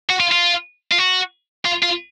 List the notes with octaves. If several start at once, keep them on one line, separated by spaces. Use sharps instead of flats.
F#4
F4
F4
F4
F#4
F4
F4